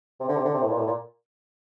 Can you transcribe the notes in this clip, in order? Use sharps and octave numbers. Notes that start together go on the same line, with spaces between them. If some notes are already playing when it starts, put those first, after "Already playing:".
C3
D3
C3
D3
C3
A2
A#2
A2
A#2